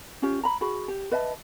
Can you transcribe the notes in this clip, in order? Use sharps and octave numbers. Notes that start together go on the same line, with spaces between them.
C#4 F4 G4
A#5 B5
F#4 G#4 B5
G4
B4 D#5 E5 A5